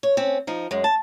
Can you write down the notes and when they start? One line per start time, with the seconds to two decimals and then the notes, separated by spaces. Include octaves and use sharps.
0.03 C#5
0.17 C4 C#4
0.47 F3 D#4
0.71 F#2 G#3
0.84 A5